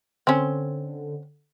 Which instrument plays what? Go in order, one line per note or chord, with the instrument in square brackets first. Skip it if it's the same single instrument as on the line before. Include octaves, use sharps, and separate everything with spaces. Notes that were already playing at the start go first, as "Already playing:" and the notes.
[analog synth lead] D3 [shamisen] C4 C#4